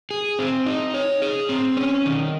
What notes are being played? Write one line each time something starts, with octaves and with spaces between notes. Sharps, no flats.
G#4
C4
D#4
C#5
G#4
C4
C#4
D#3